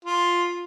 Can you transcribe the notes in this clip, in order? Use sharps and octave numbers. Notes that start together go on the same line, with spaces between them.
F4